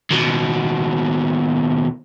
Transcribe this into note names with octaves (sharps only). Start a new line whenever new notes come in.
D#2 B2